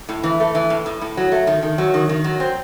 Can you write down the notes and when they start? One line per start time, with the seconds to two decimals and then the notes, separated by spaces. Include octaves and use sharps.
0.09 A2
0.23 E3
0.40 A3
0.55 E3
0.70 A2
0.86 A2
1.01 A2
1.17 F#3
1.32 A3
1.47 D#3
1.63 D#3
1.78 F#3
1.94 D#3
2.09 D#3
2.24 F#3
2.40 C4